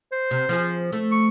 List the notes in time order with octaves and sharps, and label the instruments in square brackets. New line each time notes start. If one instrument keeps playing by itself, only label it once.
[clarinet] C5
[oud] C3
F3 G#4
A3
[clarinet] C#6